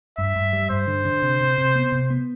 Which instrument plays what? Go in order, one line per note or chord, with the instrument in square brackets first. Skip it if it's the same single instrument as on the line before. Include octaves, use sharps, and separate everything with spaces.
[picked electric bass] G2 [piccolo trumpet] E5
[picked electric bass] G2
G3
[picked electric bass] G2 [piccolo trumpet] C5
[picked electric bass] D3
D3
C3
C3
C3
B3
C3
B3